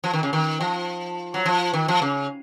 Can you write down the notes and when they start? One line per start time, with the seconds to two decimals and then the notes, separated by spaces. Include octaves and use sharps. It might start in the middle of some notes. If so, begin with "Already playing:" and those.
0.04 F3
0.13 D#3
0.23 C#3
0.33 D#3
0.61 F3
1.34 F#3
1.46 F3
1.73 D#3
1.88 F3
2.02 C#3